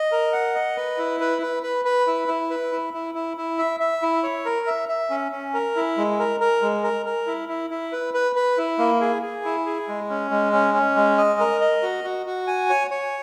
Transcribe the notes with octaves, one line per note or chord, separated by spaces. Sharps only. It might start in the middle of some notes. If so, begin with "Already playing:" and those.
Already playing: D#5
A#4
F#5
D#5
B4
E4
B4
B4
B4
B4
E4
E4
B4
E4
E4
E4
E4
E5
E5
E4
C#5
A#4
E5
E5
C#4
C#4
A#4
E4
G#3
A#4
A#4
G#3
A#4
A#4
E4
E4
E4
B4
B4
B4
E4
A#3
G#4
G#4
E4
G#4
G#3
C#4
G#3
C#4
C#4
G#3
D#5
A#4
D#5
F#4
F#4
F#4
G#5
C#5
C#5